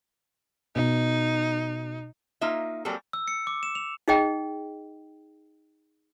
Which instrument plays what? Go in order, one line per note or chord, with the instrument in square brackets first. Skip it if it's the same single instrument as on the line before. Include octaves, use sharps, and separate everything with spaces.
[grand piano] B2 [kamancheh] D#4
[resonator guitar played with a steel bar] A#3 D#4 F4 E5
F#3 G3 A#3 C4 G#4 A4
[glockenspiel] E6
C#7
D6
E7
F7
[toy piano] D#4 G#4 D#5 G5